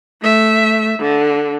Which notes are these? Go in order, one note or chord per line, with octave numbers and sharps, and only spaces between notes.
A3 E5
D3